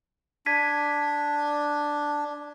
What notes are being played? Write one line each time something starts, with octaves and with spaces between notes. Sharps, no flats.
D4 G#6 B6 D#7